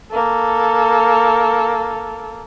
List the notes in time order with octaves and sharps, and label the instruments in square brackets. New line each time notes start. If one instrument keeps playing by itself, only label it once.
[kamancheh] A#3 A4